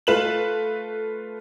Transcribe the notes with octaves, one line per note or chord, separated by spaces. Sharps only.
A3 F4 B4 E7 F#7